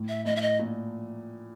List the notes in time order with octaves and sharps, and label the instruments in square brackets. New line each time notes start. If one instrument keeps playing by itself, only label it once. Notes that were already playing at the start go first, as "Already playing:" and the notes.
Already playing: [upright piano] A2
[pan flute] E5
[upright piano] A2 [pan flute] D#5
[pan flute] E5
D#5
[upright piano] A#2